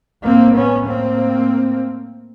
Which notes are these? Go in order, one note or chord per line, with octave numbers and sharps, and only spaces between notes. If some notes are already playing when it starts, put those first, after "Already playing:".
A2 A#3 C4
B3 C#4
A#3 C4